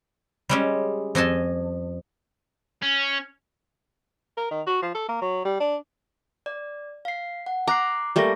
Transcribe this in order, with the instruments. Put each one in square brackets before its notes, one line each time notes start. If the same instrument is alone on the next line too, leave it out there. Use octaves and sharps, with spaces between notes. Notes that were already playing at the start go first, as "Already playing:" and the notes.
[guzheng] G3 G#3 C#4
F2 D#5 G#5 A5
[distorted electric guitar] C#4
[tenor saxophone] A#4
D#3
F#4
F3
A4
A#3
F#3
G3
D4
[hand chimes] D5
F5 C7
F#5
[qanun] A#5 [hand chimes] D6 F#6 C7
[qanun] G3 A3 A#3 [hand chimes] C#6 A#6